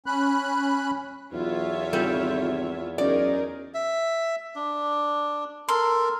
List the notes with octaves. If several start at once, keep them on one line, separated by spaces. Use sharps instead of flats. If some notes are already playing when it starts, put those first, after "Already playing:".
C#4 B5 F#6
B1 E2 F4 C#5 E5
G#1 G3 A4
F#2 D#4 G#4 A#4 D5
E5
D4
A4 A#4 C6